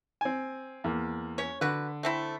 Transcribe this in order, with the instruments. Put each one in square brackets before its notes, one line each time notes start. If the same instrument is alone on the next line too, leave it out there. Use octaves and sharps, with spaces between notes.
[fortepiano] C4 G#5
E2 A#3
[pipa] C#4 C#5
[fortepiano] D3 [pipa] F#4 B4
[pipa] A3 C4 E4